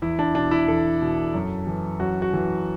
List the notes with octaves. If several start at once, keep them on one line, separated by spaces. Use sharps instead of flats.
E2 E4
D4
B2 D4
E4
E2 A4
B2
F#2
E3
F#2 F#4
F#4
E3